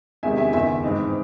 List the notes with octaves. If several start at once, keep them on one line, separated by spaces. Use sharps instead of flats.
E2 C3 D#3 G#3 E5 G#5
E5 G#5
F#1 E2 D#3 E5 G#5
G#2 E3 C4 D#4